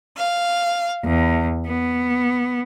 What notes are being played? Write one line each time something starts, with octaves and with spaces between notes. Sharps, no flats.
F5
E2
B3